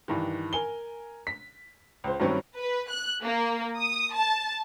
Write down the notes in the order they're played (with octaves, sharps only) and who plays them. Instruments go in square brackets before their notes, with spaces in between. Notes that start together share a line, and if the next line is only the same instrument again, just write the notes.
[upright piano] G2 D#3 E3
A#4 G#5 G7
B6
C#2 C5
G2 D#3 F#3 G3 C4 C#4
[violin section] B4
F#6
A#3
D#6
A5